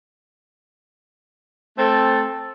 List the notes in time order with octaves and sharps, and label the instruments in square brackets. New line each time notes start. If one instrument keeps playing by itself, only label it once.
[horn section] A3 C4 A4